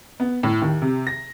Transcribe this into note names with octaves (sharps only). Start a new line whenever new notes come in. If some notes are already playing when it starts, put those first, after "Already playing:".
B3
A2
D#2
C3
A#6